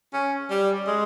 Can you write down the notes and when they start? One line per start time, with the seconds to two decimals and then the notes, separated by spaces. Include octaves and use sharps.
0.13 C#4
0.50 G3
0.87 G#3